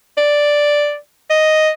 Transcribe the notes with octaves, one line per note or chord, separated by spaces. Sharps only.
D5
D#5